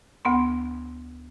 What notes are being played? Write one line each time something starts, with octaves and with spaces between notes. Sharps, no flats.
D2 B3 C6